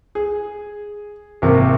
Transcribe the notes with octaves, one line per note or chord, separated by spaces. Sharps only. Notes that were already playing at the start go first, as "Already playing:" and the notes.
G#4
G#1 C3 A#3